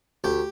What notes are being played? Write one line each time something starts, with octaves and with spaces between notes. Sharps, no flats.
D2 G4